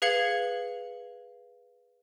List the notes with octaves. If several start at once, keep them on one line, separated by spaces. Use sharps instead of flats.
G#4 B4 F5 G#6 C#7 F#7